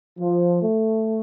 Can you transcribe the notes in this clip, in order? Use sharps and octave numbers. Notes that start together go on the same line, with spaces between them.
F3
A3